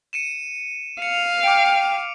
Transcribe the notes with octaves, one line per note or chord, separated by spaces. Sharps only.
C#7 D#7 E7
F5 C#7 F7
G5 D6 D7